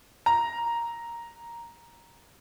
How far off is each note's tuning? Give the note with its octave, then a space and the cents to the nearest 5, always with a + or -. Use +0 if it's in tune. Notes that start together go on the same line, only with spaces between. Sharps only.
A#5 +5